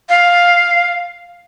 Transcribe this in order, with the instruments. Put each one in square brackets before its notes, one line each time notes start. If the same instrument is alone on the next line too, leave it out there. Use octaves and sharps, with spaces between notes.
[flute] F5